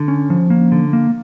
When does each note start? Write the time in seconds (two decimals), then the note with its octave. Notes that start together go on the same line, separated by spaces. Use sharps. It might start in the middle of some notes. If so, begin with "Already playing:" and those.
Already playing: D3
0.08 C#4
0.30 F3
0.50 A#3
0.72 D3
0.93 A#3